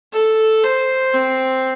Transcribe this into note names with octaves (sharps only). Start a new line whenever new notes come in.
A4
C5
C4